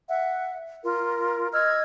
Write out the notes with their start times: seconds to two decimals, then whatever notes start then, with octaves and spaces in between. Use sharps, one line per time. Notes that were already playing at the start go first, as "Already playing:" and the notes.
0.09 E5 F#5
0.84 F4 A#4
1.52 D#5 E6 F6 G#6